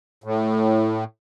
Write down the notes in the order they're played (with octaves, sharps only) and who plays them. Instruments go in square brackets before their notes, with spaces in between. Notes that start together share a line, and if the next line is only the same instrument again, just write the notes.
[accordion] A2